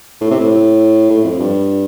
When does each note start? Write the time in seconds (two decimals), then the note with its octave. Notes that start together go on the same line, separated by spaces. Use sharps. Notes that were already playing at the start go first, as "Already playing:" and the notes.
0.21 A2
0.31 C3
0.40 A2
1.10 A2
1.24 F2
1.40 G2